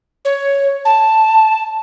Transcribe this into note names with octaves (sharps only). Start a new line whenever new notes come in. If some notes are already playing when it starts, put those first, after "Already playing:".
C#5
A5